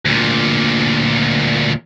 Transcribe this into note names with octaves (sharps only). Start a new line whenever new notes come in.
D2 A#2